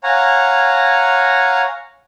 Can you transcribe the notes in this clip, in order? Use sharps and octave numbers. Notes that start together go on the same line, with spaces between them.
C#5 F5 F#5 G#5 A#5